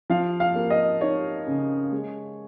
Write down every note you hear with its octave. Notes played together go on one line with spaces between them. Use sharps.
F3 F5
F5
A#3
D#5
D#4 C#5
C#3
G#3